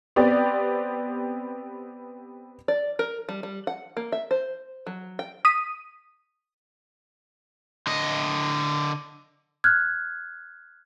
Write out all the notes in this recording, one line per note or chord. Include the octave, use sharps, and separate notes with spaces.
B3 C4 G4 D5
D5
A#4
G3
G3
F#5
A#3
E5
C5
F#3
G5
D#6 B6 D#7
D3 D#5
F6 F#6 G#6